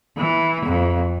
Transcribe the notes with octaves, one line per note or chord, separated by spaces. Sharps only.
E3
F2